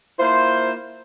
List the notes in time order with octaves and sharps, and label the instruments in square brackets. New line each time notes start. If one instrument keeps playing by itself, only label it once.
[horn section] A#3 E4 F4 C5